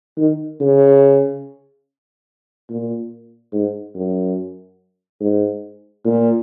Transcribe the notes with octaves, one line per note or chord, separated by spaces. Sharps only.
D#3
C#3
A#2
G#2
F#2
G#2
A#2